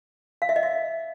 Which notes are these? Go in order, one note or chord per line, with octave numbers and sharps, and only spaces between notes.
F5
E5
D#5
E5